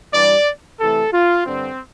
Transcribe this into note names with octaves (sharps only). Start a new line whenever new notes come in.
G2 E3 G3 D5
C3 E3 A3 A4
F4
G2 D3 G3 C4